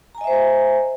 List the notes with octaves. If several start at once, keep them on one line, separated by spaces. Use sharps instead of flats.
C5 D#5 E5 G#5 A#5